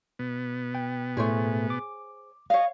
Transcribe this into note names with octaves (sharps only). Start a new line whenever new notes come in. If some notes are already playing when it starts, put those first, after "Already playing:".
B2 B3
G5
A2 A3 G#4 C5 C#5
D6
C#5 D#5 F5